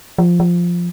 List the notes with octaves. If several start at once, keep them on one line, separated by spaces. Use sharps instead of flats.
F3
F3